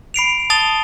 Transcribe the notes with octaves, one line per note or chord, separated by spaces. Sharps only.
B5 C7 D7 F7
A5 D#6 A6 F7 G7